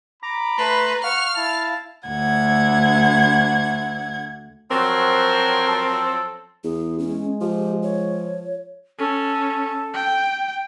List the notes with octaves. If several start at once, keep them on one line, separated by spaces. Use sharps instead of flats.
A#5 B5 D6
A3 B4 A5 A#5 C6
F5 F#5 C#6 F6
E4 A5
D2 F#5 G#6
F3 F#3 C4 F#4 A#4 C#5 G5
A4
E2 G#4
G#3 C#4
F3 G4
C#5
C#4 A4
G5